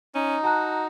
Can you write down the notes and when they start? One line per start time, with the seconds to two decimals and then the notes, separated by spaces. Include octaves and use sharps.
0.15 C#4 D#4
0.44 F#4 A5 A#5 F#6